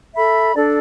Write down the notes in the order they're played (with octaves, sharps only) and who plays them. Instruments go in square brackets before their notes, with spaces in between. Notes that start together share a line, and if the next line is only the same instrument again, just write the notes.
[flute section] A4 E5 B5
D4 A4 D5